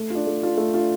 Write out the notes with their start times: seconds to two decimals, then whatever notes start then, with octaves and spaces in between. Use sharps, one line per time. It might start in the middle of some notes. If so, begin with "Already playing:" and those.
Already playing: A3
0.10 D4 F4
0.27 A3
0.43 D4 F4
0.57 A3
0.74 D4 F4